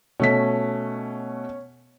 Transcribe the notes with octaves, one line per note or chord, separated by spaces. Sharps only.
B2 A3 C#4 B6